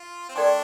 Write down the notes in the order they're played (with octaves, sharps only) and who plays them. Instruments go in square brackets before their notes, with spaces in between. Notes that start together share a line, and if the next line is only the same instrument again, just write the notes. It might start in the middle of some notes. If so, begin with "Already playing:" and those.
Already playing: [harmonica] F4
C4
[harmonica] A3 D4 [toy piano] A4 D5 G5 C6